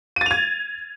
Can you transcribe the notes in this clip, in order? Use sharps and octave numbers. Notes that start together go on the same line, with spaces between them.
G#6 A6 D#7 F7